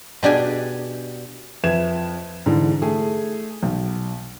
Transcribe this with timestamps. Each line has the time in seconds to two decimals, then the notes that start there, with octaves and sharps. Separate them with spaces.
0.23 B2 D4 G4 G#5
1.64 F2 B4 E5 G#6 E7
2.46 G#2 D3 E3
2.82 A3 G#4
3.63 B1